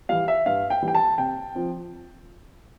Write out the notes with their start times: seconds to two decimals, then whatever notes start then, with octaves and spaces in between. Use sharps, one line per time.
0.09 E3 G3 F5
0.28 E5
0.46 G2 F5
0.70 G5
0.82 E3 G3
0.88 G5
0.95 A5
1.18 C3 G5
1.55 F3 C4